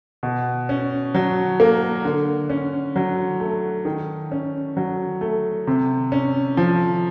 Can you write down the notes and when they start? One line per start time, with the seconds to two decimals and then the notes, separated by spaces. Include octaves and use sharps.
0.23 B2
0.69 C#4
1.15 F#3
1.60 A#3
2.05 D3
2.49 C#4
2.96 F#3
3.40 A3
3.85 D#3
4.32 C#4
4.77 F#3
5.21 A3
5.67 C3
6.12 C#4
6.57 F3